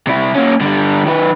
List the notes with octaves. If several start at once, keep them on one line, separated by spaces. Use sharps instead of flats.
C3 E4
A#3 C#4
D3 G3
D#3 B4